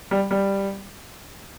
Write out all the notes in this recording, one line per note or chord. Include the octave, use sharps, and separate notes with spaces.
G3
G3